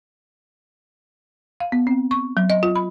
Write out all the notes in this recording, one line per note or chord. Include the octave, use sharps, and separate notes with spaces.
F5
B3
C4
C#6
F#3
D#5
F4
B5